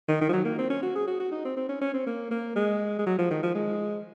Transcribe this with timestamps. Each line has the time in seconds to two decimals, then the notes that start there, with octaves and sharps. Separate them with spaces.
0.08 D#3
0.21 D#3
0.29 F3
0.33 F#3
0.45 A#3
0.58 C4
0.70 C#4
0.82 F#4
0.95 G#4
1.07 F#4
1.20 F#4
1.32 D#4
1.45 C4
1.57 C4
1.69 C#4
1.81 C#4
1.94 C4
2.07 A#3
2.31 A#3
2.56 G#3
2.99 G#3
3.06 F#3
3.19 F3
3.30 D#3
3.43 F3
3.55 G#3